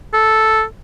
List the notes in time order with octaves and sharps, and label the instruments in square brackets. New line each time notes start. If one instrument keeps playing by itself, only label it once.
[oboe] A4